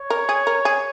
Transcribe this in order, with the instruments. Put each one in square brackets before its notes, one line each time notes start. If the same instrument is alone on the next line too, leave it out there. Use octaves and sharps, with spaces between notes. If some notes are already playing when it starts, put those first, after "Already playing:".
Already playing: [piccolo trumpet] C#5
[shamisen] A#4
G#4
A#4
G#4